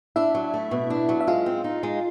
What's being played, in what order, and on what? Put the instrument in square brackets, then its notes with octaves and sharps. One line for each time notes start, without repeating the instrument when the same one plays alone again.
[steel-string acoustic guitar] D4 [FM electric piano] E4 E5
[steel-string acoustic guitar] F#3
A3
B2
D4
F#3
[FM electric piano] E5
[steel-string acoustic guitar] G#3 [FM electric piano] F4 F5
[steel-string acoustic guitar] C4
D#4
G#3